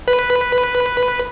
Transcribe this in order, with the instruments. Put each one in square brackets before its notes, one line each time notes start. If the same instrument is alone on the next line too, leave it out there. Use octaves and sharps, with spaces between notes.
[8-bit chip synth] B4